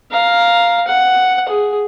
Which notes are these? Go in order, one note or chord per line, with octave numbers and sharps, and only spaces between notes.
F5 A#5
F#5
G#4